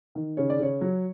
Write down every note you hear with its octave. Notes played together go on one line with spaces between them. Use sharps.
D#3
C#3 C#5
D5
C#3 C#5
F#3